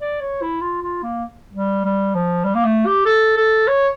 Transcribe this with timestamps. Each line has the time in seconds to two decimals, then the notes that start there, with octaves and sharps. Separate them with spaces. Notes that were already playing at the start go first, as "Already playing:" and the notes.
0.01 D5
0.21 C#5
0.42 E4
0.61 F4
0.83 F4
1.03 A#3
1.54 G3
1.85 G3
2.15 F3
2.45 G3
2.55 A#3
2.65 A3
2.86 G4
3.06 A4
3.37 A4
3.68 C#5